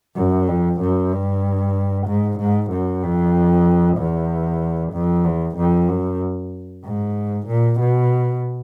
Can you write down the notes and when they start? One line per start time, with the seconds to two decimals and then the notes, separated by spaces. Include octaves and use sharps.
0.16 F#2
0.48 F2
0.81 F#2
1.13 G2
2.07 G#2
2.39 G#2
2.71 F#2
3.03 F2
3.97 E2
4.93 F2
5.24 E2
5.57 F2
5.89 F#2
6.84 G#2
7.47 A#2
7.80 B2